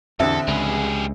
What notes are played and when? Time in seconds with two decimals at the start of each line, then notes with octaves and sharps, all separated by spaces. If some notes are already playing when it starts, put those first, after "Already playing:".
0.20 A1 E2 D3 C4 D4 A4 E5
0.47 C#2 G3 G#4